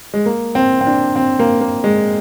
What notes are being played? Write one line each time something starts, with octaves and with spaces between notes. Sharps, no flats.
G#3
A#3
C4
C4
D4
C4
A#3
A#3
G#3